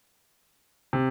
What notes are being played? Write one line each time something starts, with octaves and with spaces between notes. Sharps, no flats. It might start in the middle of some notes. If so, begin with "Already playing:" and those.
C3